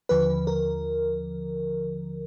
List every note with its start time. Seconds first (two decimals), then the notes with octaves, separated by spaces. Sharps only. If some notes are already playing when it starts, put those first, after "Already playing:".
0.09 D#2 D3 F3 B4
0.47 A#4